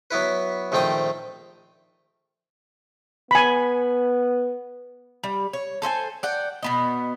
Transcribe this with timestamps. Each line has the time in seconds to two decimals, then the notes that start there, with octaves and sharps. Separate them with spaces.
0.11 F#3 B3 E4 B4
0.72 A#1 D#3 A3 C4 G5 D#6
3.31 B3 G#5 B5
5.24 G3
5.53 C#5
5.82 A4 C5 E5 G#5
6.23 D5 F#5 G5
6.63 B2 B3 D#5